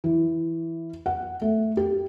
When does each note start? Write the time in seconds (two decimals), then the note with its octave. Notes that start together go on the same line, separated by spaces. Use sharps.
0.04 E3
1.06 F#5
1.42 A3
1.77 G4